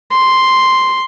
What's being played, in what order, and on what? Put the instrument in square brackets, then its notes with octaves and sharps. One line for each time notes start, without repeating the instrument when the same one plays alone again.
[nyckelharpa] C6